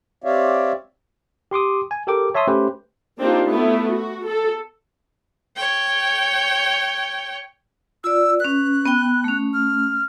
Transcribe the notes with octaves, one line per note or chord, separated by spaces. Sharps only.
C4 G4 C#5 D5 E5 F5
G4 C6 D6 D#6
G#5
G4 A4 A#4 G5 D6
C#5 E5 A5 C6 D#6 E6
A3 C#4 G4 B4 C5
A#3 C4 D4 D#4 F4 G4
A3 B3 E4
F#4
A4
C#5 G5
F4 D5 E6
C#4 B4 F#6
B3 G5
A3 C#4
F6